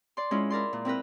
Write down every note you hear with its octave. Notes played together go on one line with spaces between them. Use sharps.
D5 C6
G#3 C#4 E4 F4
E4 A#4 D5 C6
A#2
C4 E4 A#4 B4